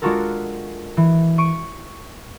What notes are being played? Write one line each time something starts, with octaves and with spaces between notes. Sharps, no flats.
G#3 D4 F4 F#4 A4 A#4
E3
C#6 D7 D#7